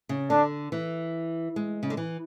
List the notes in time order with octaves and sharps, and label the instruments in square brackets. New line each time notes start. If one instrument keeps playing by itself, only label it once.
[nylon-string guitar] C#3
[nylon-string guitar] D3 [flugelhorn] D4
[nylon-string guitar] E3
G#3
C#3
D3
E3